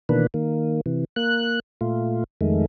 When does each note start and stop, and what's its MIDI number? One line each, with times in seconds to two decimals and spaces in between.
0.09 0.27 47
0.09 0.27 51
0.09 0.27 52
0.09 0.27 58
0.09 0.27 62
0.09 0.27 71
0.34 0.81 51
0.34 0.81 58
0.86 1.05 48
0.86 1.05 52
1.16 1.60 58
1.16 1.60 90
1.81 2.24 46
1.81 2.24 57
1.81 2.24 65
2.41 2.66 41
2.41 2.66 51
2.41 2.66 56
2.41 2.66 57